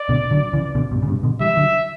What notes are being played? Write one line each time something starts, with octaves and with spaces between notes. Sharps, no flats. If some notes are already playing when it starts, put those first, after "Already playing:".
Already playing: D5
B2 D3
D3 F#3
C#3 E3
B2 D3
G2 B2
C#3
G2 B2
B2 D3
E3 G3 E5
D3 F#3